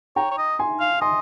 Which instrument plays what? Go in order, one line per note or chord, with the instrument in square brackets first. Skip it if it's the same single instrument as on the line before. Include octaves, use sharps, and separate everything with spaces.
[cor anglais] C#5 [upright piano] G5 A#5
[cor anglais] C#5
D#5
[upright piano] G#5 C6
[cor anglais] F5
[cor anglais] D#5 [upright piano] G#5 C6